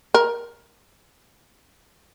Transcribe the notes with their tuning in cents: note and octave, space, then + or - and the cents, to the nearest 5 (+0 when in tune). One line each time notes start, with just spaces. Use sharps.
A#4 +15